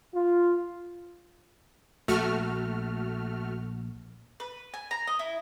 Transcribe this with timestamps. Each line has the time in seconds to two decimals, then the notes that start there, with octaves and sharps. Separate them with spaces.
0.14 F4
2.08 A#1 A3 F#4 F6
4.40 B4
4.74 G#5
4.91 A#5
5.07 D#5
5.19 E4